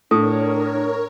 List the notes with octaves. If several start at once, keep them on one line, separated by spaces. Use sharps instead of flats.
A2 D4 A4 A#4 C#5